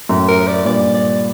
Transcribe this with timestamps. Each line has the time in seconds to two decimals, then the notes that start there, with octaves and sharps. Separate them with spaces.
0.09 F#2 A2
0.28 A#4
0.47 D5
0.65 G2 A#2 D5
0.94 D5